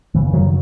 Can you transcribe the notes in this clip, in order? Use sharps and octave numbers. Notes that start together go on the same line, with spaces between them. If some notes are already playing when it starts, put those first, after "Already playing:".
F#2 C#3 E3
D#3 F#3